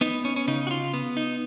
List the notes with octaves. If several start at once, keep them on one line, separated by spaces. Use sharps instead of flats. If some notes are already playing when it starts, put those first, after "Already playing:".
B3 D#4
C#4
C#4
C#3 D#4
F#4
F4
B3
D#4